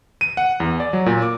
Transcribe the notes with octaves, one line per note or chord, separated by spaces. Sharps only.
D#7
F#5
E2
D5
F#3
A#2
D6